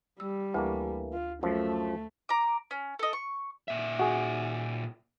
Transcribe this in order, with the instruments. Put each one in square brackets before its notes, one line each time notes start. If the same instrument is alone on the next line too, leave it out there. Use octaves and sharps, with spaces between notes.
[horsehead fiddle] G3 [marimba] E6
[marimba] D2 [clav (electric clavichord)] E3 A3 A#3
[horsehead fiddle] F4
[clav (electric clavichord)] F#2 F3 [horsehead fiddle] A3
[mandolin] A#5 D6
C#4
A4 D#5
C#6
[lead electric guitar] A#2 E5
[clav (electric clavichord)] F#4 G#4